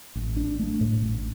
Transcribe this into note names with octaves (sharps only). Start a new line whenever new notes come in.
A1
D4
A3
A2
A1